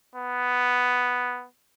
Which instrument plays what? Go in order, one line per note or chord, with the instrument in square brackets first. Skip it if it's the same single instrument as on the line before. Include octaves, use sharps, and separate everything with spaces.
[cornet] B3